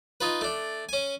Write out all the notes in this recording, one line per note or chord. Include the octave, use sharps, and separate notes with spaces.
D#4 F4 B4
A3 D4
C#4 G#5